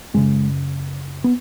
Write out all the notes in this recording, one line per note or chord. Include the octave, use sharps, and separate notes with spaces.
F#2 C#3 G#3
B3